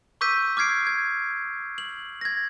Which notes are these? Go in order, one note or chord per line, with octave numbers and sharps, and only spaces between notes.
C#6 D6 E6 G6 B6 D#7
D6 F6 G#6 C7 D7
G#6
F#7
G#6 A#6